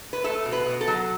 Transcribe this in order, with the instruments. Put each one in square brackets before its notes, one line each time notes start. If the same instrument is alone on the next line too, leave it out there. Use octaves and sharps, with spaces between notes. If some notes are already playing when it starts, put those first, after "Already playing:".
[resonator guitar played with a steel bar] B4
A3 A4
B2
B4
B2
A4
F#3